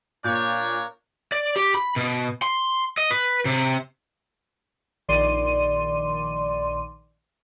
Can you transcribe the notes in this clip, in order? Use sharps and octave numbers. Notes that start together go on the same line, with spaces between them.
A#2 D4 A#4 C#5 G6
D5
G4
B5
B2
C6
D#5
B4
C3
A#1 D#3 D5 C6 D#7